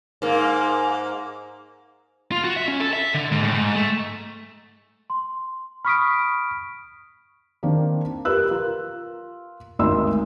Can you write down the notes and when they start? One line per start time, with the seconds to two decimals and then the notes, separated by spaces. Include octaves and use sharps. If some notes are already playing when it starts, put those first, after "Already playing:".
0.22 G#2 A#3
2.32 F4
2.44 F#4
2.56 E5
2.68 C#4
2.80 A4
2.93 E5
3.14 D3
3.31 G#2
3.43 A2
3.54 G#2
3.75 A3
5.10 C6
5.85 B5 C#6 D#6 F6 B6 D7
7.63 D#3 A#3 C4 D4
8.25 G4 A#4 B4 E6 F#6
8.51 F4 A#4
9.79 G#1 D2 D#4 C6 E6